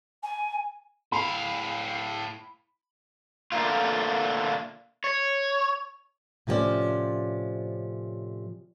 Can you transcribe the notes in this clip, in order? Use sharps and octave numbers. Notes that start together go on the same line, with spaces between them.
G#5
A2 F5 B5
A#2 D3 F#3 A3 A#3 F4
C#5
A2 C3 F3 A#3 C#4 D5